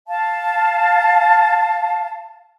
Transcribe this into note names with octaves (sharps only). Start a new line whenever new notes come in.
F5 A5